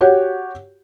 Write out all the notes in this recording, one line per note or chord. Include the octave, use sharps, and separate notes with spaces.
F#4 G4 C#5 F#5